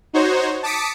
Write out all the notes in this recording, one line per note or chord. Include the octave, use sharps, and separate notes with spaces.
D#4 F#4 C5 C#5
A5 D6 D#6 B6 C#7 D7